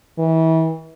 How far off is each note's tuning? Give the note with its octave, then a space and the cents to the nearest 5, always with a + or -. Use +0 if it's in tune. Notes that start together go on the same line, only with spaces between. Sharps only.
E3 -30